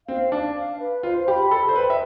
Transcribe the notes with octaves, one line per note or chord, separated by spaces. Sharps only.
C4 F5
D4 A5
F5
B4
F4 C5
G4 B5
A4 B5
C5
B4 G5
E5